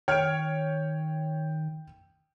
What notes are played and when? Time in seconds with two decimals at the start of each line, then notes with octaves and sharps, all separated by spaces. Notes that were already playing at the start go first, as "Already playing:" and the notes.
0.08 D#3 C#5 G5 F6 G#6 D7